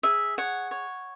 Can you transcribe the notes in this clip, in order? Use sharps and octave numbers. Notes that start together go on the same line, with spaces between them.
G#4 E5
C#5 F#5
C#5